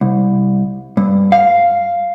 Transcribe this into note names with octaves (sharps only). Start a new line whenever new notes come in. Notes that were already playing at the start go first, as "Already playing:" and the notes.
C2
G2
F5